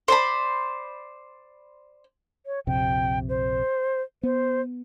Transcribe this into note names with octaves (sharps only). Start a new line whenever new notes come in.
C5 D5 B5
C#5
A#1 F2 C3 G5
C5
B3 C5